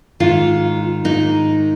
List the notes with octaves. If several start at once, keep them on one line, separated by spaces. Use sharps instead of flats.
G#2 D#3 F4
G#2 D#3 D#4